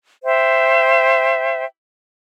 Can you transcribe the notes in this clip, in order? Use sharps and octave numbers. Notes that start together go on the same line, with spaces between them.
C5 E5 G5